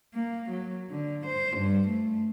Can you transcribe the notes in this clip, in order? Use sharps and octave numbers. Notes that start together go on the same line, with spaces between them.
A#3
F#3
D3
C5
G2
A3